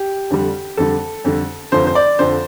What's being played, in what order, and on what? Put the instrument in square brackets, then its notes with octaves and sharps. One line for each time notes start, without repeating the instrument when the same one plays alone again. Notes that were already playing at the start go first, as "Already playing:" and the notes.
Already playing: [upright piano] G4
F2 D3 G3
F2 D3 G3 A4
F2 D3 G3
F1 F2 D3 F3 C5
C5
D5
F2 D3 F3 C5